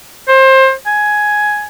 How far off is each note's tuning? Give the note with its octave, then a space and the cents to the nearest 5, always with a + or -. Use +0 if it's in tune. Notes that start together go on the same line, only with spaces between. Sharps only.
C5 +25
G#5 +10